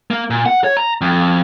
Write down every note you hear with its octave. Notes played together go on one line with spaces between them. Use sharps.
A#3
A#2
F#5
C#5
A#5
F2